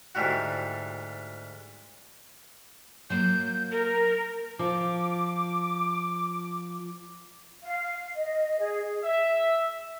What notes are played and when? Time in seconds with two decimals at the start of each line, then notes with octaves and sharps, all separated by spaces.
0.15 D2 G#2 G3 E4 F#4
3.10 F#3 A#3 G6
3.72 A#4
4.59 F3 D6
7.62 F5
8.15 D#5
8.59 G#4
9.03 E5